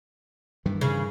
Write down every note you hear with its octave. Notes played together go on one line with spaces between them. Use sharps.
G2 D#3 E3
C#3